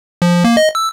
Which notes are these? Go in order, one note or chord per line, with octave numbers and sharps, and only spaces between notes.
F3
A#3
D#5
E6